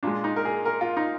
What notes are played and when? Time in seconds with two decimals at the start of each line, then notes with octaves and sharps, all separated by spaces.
0.03 A#2 G#3 D4
0.24 D#4
0.36 A#4
0.45 G#4
0.65 A#4
0.81 F4
0.97 D#4